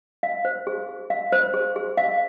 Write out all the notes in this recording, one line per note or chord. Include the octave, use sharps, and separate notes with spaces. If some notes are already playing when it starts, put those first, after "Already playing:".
F5
C5
G#4
G#4
F5
C5
G#4
G#4
F5